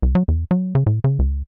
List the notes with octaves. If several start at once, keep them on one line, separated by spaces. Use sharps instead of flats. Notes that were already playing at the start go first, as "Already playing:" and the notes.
C2
F#3
E2
F#3
C#3
A2
C#3
C#2